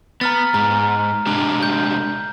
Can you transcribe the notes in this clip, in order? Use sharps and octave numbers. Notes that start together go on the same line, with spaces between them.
B3 A#5 F6 A6
G#2 A#5
C3 G#3 D4
G6